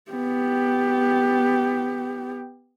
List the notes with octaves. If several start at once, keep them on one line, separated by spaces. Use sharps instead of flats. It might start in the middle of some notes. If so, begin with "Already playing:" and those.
B3 G4